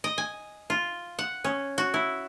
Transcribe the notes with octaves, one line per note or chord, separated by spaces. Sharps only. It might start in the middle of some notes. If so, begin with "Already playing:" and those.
D#5
G#5
F4
F#5
C#4
F#4
E4